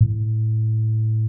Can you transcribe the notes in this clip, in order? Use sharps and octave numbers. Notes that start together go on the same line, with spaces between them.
A2